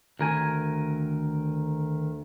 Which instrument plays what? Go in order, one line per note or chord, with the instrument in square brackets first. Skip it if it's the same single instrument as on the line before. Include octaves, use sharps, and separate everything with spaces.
[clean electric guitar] D2 A#4 G#5 [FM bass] D#3